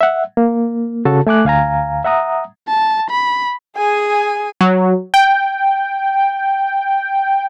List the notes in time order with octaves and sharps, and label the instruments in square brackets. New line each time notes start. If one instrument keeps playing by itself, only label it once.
[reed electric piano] E5 F#5
A#3
C#3 F#4 A4 A5
A3 G#5 D6 F#6
D2 F5 G#5 A#5
E5 F#5 A#5 D#6
[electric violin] A5
B5
[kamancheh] G#4 G#5
[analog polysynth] F#3
G5